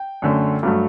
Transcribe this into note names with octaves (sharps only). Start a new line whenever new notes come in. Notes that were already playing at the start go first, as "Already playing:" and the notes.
Already playing: G5
F#2 D3 A3
G2 F#3 A3